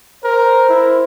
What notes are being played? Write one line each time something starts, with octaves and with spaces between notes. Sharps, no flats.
A#4 C5
E4